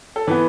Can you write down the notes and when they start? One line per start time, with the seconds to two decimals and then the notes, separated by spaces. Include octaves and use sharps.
0.16 A4
0.27 E3 B3 B4